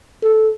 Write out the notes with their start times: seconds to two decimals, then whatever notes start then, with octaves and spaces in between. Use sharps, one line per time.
0.23 A4